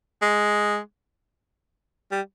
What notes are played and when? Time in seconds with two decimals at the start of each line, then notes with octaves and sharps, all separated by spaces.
0.22 G#3
2.11 G3